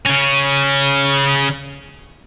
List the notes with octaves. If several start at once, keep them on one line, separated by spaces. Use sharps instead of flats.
C#3 C#4